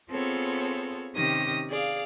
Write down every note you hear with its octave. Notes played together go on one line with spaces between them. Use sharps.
B3 C4 F4 G#4 A4 C#5
C3 D#3 C#4 G4 D#6 A#6
G#4 D5 F5